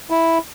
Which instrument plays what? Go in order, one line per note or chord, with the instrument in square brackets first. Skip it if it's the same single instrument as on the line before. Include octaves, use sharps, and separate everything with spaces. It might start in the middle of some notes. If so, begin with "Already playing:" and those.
[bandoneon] E4